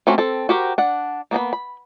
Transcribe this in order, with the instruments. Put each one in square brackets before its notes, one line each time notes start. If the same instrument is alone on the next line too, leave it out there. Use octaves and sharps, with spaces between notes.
[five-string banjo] A3 A#3 C4 C#4 F#4
C4 A4
F#4 G4 A#4 C5
D4 F#5
A#3 B3 A#5 B5
B5